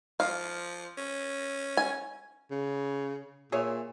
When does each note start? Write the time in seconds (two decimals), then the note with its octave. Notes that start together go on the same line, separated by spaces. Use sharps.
0.20 F3 F5
0.98 C#4
1.77 G#5
2.51 C#3
3.52 A#2 G#4 C#5 E5